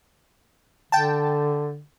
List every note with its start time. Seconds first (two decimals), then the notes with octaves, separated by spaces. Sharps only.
0.92 D3 G5 A5